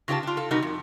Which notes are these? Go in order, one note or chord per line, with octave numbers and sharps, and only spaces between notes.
C#3 F4 G4 C#5 A5
D4 F4
A4 F5
C3 G3 D#4 F#4 A#4
F2